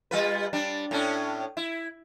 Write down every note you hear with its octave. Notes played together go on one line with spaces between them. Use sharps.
G3 F4 B4
G3 D4
A2 C#4 D4
E4